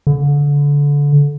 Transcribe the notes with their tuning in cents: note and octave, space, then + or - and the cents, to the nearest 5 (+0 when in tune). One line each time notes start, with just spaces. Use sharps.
D3 -25